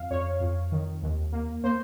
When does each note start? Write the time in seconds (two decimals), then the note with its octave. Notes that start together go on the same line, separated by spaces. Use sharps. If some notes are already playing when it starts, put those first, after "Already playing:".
Already playing: F2 F5
0.11 F2 C#5
0.41 F2
0.72 D#3
1.03 D#2
1.33 A#3
1.64 A#3 C5